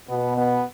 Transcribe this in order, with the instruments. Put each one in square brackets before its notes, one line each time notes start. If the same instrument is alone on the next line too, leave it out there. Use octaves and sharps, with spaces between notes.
[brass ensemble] B2 [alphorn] B3
[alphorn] B3